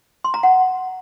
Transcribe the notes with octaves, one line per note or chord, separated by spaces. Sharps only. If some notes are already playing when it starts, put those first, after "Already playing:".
C6
A#5
F#5